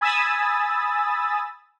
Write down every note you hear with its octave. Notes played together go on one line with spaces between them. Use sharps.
G#5 B5 D#6 E6 A6